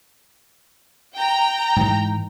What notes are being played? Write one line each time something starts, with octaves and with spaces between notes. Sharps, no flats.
G5 A#5
G#2 E3 G#3